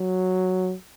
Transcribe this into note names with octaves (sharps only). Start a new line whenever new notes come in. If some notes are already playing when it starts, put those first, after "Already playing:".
Already playing: F#3